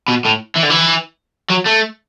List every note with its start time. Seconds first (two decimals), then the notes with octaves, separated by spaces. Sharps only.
0.08 B2
0.25 A2
0.56 E3
0.63 D3
0.70 E3
1.50 F#3
1.66 A3